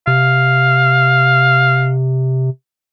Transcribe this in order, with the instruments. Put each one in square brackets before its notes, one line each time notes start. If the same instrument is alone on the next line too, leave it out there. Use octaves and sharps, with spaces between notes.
[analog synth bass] C3 [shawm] F5